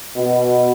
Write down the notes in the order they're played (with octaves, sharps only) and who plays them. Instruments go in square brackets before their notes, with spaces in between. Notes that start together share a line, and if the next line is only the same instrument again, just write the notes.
[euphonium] B2